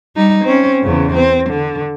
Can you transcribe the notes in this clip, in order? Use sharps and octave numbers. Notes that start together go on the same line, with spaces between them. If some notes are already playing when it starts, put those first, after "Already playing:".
G3 D#4
C4 C#4
E2 C#3
C4
D3